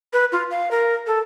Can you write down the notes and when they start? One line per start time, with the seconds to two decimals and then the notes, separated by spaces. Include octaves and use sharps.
0.13 B4
0.32 F4
0.51 F5
0.71 A#4
1.07 A4